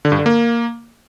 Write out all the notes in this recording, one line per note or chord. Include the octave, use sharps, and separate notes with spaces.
D3
G2
D3
A#3